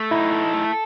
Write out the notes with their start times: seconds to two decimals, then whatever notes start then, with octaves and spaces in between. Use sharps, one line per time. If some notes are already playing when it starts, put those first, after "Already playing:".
Already playing: A3
0.11 D#4 E4
0.32 A4
0.53 A3